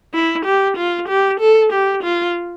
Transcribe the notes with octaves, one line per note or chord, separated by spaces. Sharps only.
E4
G4
F4
G4
A4
G4
F4